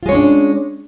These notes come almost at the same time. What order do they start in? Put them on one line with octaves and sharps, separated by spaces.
F4 G#3 C#5 C#4 D4